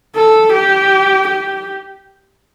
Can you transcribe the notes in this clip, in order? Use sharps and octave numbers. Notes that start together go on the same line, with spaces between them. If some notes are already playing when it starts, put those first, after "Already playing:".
A4
G4
G4